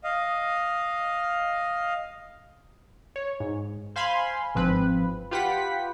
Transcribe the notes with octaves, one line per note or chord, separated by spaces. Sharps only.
D#5 F5
C#5
G#2
C5 F5 G#5 B5 C6
G1 G#2 F3 C4 B4
F4 G4 B4 F#5 G5 B6